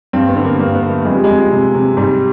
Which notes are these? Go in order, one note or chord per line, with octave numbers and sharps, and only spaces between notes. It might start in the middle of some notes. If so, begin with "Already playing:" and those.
G2 C4
B3
D3
A#3
G2 A#3
B3
D3
A3
F2 G#3
G3
F2 G#3
C3
C3
G#2 G3